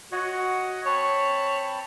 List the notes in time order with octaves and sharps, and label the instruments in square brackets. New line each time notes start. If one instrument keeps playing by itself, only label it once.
[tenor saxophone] F#4 [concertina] C#5 D#5 F#5
[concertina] C4 A5 B5 [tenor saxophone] C#5